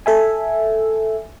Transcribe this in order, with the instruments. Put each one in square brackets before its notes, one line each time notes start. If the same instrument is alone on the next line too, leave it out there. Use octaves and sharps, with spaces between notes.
[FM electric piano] A4 E5 G#5